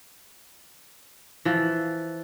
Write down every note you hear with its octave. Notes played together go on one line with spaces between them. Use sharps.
E3 F3